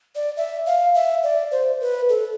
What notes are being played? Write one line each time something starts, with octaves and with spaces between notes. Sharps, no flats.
D5
E5
F5
E5
D5
C5
B4
A4